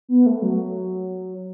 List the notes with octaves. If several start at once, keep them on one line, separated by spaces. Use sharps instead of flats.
B3
A3
F#3